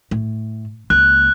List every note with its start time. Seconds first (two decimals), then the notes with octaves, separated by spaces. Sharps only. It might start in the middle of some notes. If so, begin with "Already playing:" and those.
0.11 A2
0.90 C#2 A#3 F#6